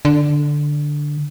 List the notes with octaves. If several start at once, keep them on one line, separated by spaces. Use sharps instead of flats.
D3